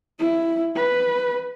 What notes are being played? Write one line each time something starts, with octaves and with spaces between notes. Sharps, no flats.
E4
B4